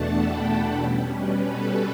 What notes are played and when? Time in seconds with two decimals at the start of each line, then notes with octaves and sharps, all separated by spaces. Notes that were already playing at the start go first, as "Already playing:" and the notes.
Already playing: E2 B2 A3 D4 F#5 A5
0.15 G5 B5
0.46 F#5 A5
0.78 B2 G3 C#4 A4 C#5
1.10 B4
1.41 A4